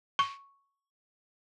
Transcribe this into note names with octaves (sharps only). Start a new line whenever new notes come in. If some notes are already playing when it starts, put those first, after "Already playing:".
C#6